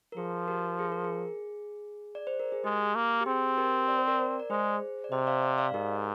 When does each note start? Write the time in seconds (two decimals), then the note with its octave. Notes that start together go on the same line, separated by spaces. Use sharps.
0.12 A#4
0.17 F3 G#4
0.48 G4 A#4
0.79 G#4
0.92 A#4
1.04 G#4
2.15 D5
2.27 C5
2.40 A#4
2.52 G#4
2.64 G#3 G4
2.95 A#3
3.21 G4
3.26 C4 G#4
3.58 G4 A#4
3.88 D5
3.98 C5
4.08 A#4 D5
4.39 D5
4.50 G#3 G#4 C5
5.04 D5
5.12 C3 C5 D#5
5.27 D5 F5
5.42 D5 F5
5.58 D5 F5
5.73 G#2 G4 A#4